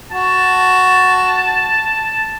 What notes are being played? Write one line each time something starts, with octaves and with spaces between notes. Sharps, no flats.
F#4 A5